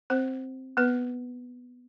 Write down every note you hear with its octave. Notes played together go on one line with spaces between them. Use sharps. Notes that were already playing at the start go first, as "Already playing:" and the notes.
C4 C5
B3 B4